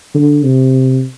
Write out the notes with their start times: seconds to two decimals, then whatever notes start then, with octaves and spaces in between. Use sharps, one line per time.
0.15 D3
0.43 C3